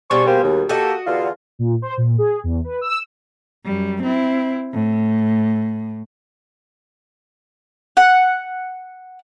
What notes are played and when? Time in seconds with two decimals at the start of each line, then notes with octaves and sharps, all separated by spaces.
0.11 B2 G3 D4 G#4 C5 C#6
0.27 A#3 G4 C5
0.43 D#2
0.69 A#3 F#4 G4 A4 D#5
1.07 E2 D3 F4
1.59 A#2
1.82 C5
1.97 A#2
2.18 G#4
2.44 E2
2.64 B4
2.81 E6
3.65 F#2 G3
4.02 C4 E4
4.73 A2
7.97 F#5